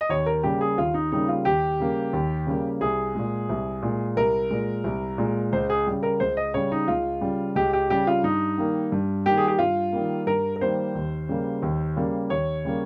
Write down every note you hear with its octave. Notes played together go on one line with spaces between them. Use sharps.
D#5
D#2 C#5
A#4
C#3 G3 A#3 G4
G#4
D#2 F4
D#4
C#3 G3 A#3 D#4
F4
D#2 G4
C#3 G3 A#3
D#2
C#3 G3 A#3
C2 G#4
A#2 G#3
C2
A#2 G#3
C2 A#4
A#2 G#3
C2
A#2 G#3
C#2 C5
G#4
C#3 G3
A#4
C#2 C5
D#5
C#3 G3 C#5
D#4
C#2 F4
C#3 G3
C#2 G4
G4
C#3 G3 G4
F4
G2 D#4
D#3 G3 A#3
G2
D#3 G3 A#3 G4
G#4
G4
G2 F4
D#3 G3 A#3
G2 A#4
A#4
D#3 G3 A#3 C5
D#2
C#3 G3 A#3
D#2
C#3 G3 A#3
D#2 C#5
C#3 G3 A#3